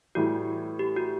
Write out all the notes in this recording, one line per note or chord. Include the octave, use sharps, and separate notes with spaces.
A2 E3 G3 F#4
G4
F#4